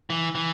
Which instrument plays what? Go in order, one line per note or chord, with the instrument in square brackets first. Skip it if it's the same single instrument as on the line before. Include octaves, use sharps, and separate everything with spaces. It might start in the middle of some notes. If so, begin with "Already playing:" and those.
[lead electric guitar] E3
E3